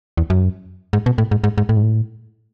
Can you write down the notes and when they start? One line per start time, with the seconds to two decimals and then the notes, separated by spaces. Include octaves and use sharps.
0.17 E2
0.30 F#2
0.93 G#2
1.06 B2
1.18 A2
1.31 G#2
1.44 G#2
1.58 G#2
1.69 A2
1.77 G#2
1.82 A2